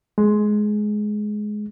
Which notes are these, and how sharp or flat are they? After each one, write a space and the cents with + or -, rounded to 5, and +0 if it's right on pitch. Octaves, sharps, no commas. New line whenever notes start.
G#3 +15